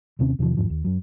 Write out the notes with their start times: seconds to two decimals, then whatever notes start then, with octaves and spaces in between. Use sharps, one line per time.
0.19 D#2 C3 C4 C#4
0.39 E2 C3 D#3 F3
0.57 A1 E2 G#2 F3
0.70 D#2
0.84 F#2 F#3